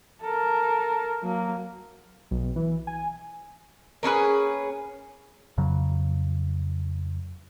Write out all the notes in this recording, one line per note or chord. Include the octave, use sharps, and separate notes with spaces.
A4 A#4
F#3 A#3
B1
E3
G#5
A#3 C#4 G#4 B4
F2 C#3 F#3